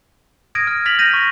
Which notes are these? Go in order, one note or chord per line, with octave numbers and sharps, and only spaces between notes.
D#6 F6 G#6 A#6 D7 D#7
F6
F6 A6 B6 F7 F#7
G6 A#6 D#7
C#6